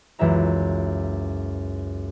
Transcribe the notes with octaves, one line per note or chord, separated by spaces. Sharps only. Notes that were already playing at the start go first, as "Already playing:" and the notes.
C#2 F#2 E3 E4 E5 A#5